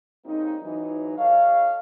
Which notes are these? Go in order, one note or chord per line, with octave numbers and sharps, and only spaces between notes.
C#3 G3 A#3 C4 D#4
G#2 E3 F#3 D#4
F#4 A4 C#5 D#5 F5